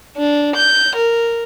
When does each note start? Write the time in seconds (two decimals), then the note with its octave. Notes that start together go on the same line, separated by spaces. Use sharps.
0.17 D4
0.56 G6
0.96 A#4